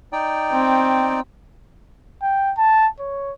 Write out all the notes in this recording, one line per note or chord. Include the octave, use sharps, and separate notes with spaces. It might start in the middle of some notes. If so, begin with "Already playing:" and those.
D#4 D5 G5
C4
G5
A5
C#5